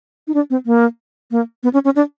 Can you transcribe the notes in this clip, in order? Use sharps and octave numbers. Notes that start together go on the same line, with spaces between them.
D#4
D4
C4
A#3
A#3
B3
C#4
C#4
D4